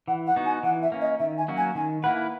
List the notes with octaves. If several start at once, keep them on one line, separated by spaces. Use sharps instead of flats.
E3 F#5
F#5
B3 D#4 F#4
G#5
E3 F#5
E5
A#3 C#4
D#5
D#3 E5
G#5
F#3 A#3 C#4 F#4
G#5
D#3 G#5
A#3 E4 B4 F#5